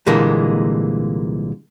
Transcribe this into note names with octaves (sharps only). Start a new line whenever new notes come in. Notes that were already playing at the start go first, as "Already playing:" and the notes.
C2 A#2 D3 E3 G#3 A#3